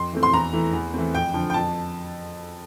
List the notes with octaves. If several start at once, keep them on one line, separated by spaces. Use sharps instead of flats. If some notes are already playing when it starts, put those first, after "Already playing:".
Already playing: F2 C6
E3 A3 C4
C6
E2 A#5
E3 A3
E2
E3 A3 C4
F2 G5
D3 F3
G5
F2 A5